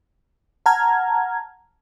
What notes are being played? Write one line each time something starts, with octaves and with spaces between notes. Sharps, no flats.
F#5 A5 A#5 F6 G#6